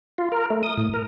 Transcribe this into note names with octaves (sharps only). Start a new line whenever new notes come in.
F4
A#4
A3
D#6
A2
A#4